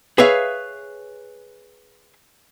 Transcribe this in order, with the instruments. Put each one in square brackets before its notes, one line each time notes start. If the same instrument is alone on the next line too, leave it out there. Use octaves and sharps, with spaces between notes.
[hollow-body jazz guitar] G#4 B4 C#5 E5 F5